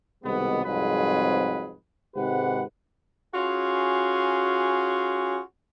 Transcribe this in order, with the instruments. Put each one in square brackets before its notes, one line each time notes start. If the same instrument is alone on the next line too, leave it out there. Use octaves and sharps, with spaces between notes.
[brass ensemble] C2 B2 D#3 G#3 B3
C2 F2 G#2 F#3 G#4 B4
G#1 G#2 C3 G4 B4 F#5
[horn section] C#4 F4 F#4 G#4